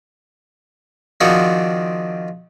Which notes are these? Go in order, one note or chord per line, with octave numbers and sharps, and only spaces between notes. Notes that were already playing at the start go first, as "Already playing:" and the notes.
D#3 F3 C4 D4 F#4 G#4